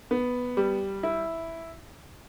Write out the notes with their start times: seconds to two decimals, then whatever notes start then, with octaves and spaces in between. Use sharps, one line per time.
0.11 B3
0.57 G3
1.03 E4